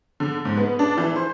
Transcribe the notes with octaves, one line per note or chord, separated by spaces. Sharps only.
D3
G#2
B3
D4
E3
C5